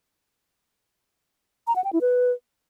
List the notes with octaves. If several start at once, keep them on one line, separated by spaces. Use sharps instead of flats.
A#5
F#5
G5
E4
B4